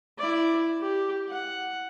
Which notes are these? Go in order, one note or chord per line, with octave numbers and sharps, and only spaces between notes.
E4 D5
G4
F#5